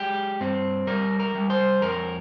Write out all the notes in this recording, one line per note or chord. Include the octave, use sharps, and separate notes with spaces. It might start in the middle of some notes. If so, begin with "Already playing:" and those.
Already playing: G#3 G4
G2 C4
G3 A#4
A#4
G3
C5
F2 A#4